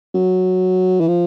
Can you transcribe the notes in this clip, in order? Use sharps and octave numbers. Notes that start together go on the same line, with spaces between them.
F#3
E3
F3